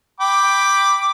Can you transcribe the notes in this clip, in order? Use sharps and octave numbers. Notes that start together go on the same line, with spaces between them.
G5 B5 D6